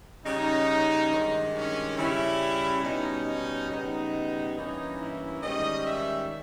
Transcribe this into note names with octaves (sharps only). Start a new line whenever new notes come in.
C#3 G3 C#4 D#4
G2 D#3 G#3
C#4
C#3 G3 C#4 E4
B2 G3 C#4 D#4
D#4
C#3 G3 B3 D#4
G2 E3 A#3 C#4 D#4
E4
G#2 D#3 G3 C#4 D#5
E5